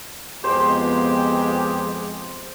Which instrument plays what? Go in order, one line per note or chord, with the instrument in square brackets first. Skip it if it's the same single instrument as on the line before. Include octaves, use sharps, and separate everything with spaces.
[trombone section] F2 G#3 [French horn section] B3 [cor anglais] G4 [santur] C5